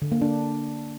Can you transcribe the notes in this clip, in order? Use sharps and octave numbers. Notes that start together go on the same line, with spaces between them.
D3
A#3
D4